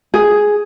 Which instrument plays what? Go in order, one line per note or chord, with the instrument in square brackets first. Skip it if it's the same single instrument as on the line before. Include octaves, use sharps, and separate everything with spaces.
[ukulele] G#4